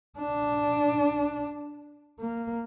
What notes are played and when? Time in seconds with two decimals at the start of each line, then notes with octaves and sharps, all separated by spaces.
0.18 D4
2.20 A#3